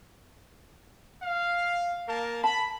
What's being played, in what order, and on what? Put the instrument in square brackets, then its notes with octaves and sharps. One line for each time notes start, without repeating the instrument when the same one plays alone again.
[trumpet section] F5
A#3 A#4 A5
[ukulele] A5 [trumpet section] B5